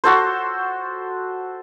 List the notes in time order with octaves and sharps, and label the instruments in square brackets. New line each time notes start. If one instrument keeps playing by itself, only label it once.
[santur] F#4 A4 C5